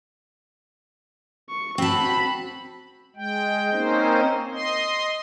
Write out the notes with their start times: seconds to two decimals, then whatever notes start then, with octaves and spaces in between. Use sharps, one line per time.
1.49 C#6
1.78 C4 F#4 A5 B5
3.16 G#3 G5
3.72 A#3 C4 C#4 D#4 C5
4.52 D#5 C6